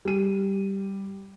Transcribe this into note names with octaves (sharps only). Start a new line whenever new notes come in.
G3 D#7